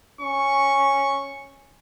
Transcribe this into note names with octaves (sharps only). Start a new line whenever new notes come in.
C#4 C#6